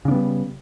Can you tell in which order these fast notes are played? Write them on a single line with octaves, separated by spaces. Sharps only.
C#3 D4 B3 G3